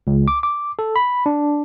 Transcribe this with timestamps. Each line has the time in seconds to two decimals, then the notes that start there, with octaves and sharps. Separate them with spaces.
0.07 C#2
0.28 D6
0.43 D6
0.79 A4
0.96 B5
1.26 D4